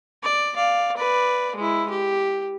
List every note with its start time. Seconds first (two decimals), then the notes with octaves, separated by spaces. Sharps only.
0.23 D5
0.56 D5 F5
0.97 B4 D5
1.56 G#3 E4
1.90 G4